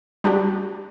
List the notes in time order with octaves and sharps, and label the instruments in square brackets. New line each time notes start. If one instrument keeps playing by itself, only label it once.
[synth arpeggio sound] G3 D4 F#4 G4